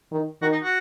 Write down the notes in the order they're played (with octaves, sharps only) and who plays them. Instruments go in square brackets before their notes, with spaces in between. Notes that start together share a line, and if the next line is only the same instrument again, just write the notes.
[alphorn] D#3
[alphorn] D#3 [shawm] F#4
[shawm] D#4
F#4